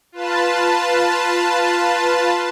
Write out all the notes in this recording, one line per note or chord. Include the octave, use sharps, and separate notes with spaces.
F4 B4 A5